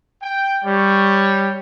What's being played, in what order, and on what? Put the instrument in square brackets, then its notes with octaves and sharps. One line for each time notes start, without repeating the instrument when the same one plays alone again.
[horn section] G5
[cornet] G3 [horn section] C#5